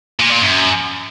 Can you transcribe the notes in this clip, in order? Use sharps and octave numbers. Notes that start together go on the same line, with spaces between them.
A#2
A#2
F#2